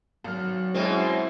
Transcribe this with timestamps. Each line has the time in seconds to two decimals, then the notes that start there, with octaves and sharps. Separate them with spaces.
0.24 G#1 F#3 F6
0.74 F#2 B2 G#3 C4 C#4 E4